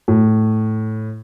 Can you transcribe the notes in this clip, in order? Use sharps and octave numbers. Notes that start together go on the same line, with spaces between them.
A2